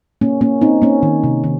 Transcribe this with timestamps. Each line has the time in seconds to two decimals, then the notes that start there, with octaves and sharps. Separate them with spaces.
0.21 A#3 C#4
0.41 A#3 C#4
0.61 C4 D#4
0.82 A#3 C#4
1.03 D#3
1.24 C3
1.44 D#3